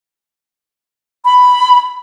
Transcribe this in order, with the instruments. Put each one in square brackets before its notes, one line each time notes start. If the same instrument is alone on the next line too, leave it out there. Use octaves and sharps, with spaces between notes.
[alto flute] B5